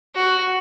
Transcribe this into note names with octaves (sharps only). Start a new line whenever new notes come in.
F#4